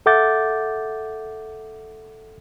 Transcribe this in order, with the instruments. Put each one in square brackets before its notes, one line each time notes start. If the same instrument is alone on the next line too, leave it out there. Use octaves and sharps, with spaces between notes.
[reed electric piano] A4 E5 F#5 D6 G6 A6